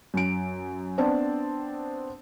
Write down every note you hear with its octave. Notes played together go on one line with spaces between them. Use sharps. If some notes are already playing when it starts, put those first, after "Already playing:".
F#2 D7
B3 C4 D4 D5 A5